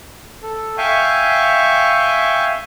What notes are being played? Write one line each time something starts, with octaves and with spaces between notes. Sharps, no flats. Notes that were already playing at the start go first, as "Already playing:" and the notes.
A4
E5 F5 G5 G#5 C#6